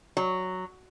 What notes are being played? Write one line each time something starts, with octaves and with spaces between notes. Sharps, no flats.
F#3